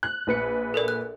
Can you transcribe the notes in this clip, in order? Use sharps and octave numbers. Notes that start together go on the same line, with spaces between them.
F#6
A#1 B4 C#7
A4 A#4 D5
F#6